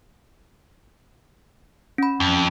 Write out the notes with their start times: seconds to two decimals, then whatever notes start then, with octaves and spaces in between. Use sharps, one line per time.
1.98 C#4 B5
2.20 F2